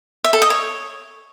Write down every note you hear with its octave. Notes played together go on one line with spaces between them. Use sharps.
E5
A4
D#5
C#5